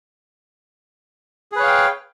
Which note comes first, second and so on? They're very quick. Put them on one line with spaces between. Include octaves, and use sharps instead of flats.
G#4 B4 C#5 F5 G5